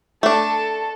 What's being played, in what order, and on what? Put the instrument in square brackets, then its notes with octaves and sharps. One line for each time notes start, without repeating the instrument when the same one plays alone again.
[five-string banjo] A3 D4 [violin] A4